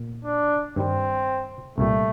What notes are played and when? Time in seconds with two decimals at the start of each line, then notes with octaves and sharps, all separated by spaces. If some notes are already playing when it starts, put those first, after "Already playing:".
Already playing: A#2
0.25 D4
0.76 G2 D#3 G3 C4
1.78 C2 A#2 G3 A3